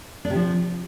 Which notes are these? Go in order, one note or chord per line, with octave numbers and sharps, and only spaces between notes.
D4
C3
F3